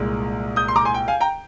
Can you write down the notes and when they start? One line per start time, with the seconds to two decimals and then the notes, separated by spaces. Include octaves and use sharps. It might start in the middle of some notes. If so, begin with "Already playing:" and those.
Already playing: C2 A#2 G#3
0.56 D#6 G6
0.68 C6
0.76 A#5 D6
0.85 G#5 C6
0.94 G5
1.08 F5 G#5
1.21 G5 A#5